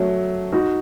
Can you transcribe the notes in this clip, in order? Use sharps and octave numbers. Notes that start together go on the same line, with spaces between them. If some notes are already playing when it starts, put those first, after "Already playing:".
Already playing: F#3 A3
D#4 F#4